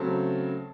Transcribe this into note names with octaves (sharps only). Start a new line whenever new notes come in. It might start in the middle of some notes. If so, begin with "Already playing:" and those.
Already playing: C#3 F#3 A3 C4 A5